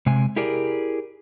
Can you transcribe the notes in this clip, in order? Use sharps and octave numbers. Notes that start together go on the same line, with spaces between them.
C3 G#3 G#5
E4 G4 G#4 A#4 D5